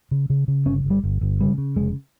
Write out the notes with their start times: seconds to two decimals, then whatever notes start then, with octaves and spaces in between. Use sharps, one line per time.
0.11 C#3
0.30 C#3
0.48 C#3
0.66 G1 C#4
0.84 G1
0.90 G3
1.03 G1
1.21 G1
1.40 C#3 G3
1.58 C#3
1.76 F1 G#3